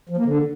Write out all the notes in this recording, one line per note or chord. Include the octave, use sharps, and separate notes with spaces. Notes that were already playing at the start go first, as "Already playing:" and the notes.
F3
A#3
D3